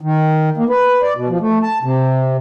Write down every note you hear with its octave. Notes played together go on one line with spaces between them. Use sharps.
D#3
A#3
B4
D5
B2
F3
A3
A5
C3